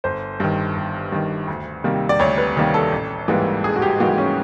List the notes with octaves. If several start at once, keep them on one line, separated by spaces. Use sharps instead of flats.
G1 C5
G2 D#3
G1
G2 D#3
D2
C3 D#3 G3 A#3
D5
D2 C#5
B4
C3 D#3 G3 A#3
A4
A1
G#2 E3 G3 A#3
A1 G#4
F#4
G4
G#2 E3 G3 A#3 F#4
C#4